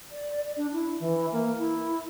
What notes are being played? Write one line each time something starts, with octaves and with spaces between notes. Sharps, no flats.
D5
D4
E4
E3
A#3
E4